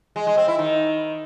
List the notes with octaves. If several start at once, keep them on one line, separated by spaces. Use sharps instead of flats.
G#3
G#3
C4
E4
D#3